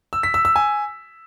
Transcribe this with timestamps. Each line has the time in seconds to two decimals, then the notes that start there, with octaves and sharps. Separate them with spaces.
0.13 E6
0.23 B6
0.34 E6
0.45 E6
0.56 G#5